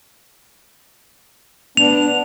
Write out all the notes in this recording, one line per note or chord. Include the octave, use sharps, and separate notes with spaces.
B3 D4 F7